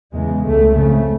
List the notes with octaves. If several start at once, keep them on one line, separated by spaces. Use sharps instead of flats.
E2 C#3 G#3
C#2 C#3 A3
F2 C#3 A3